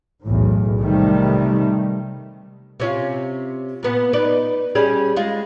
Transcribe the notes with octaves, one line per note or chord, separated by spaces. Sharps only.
B1 E2 A2
C3 D#3 G3 A3
C3 C#4 F4
A#2 B3
D#4 B4 D5
G3 C#4 G#4
G#3 F4